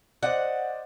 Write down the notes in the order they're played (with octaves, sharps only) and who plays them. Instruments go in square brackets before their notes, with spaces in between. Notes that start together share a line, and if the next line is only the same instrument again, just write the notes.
[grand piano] C5 D5 D#5 [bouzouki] F#5